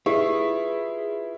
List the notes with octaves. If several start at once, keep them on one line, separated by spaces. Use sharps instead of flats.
E4 F4 G4 G#4 B4